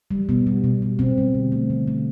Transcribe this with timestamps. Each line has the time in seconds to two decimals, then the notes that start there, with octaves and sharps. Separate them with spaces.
0.11 G3
0.29 B2 B3
0.47 G3
0.64 B2
0.82 G3
0.99 B2 C4
1.18 G3
1.34 D3
1.52 A3
1.70 D3
1.87 A3